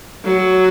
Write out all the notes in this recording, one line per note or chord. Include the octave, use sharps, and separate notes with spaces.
F#3